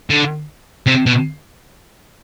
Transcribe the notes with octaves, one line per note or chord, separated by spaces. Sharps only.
D3
C3
B2